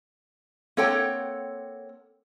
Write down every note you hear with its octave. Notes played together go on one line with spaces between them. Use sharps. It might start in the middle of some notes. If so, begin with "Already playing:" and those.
A#3 C4 A4 C#5 F#5 G5